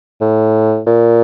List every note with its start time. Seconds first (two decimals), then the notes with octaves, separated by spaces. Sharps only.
0.21 A2
0.87 A#2